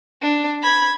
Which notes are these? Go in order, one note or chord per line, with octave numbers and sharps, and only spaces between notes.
D4
B5 G#6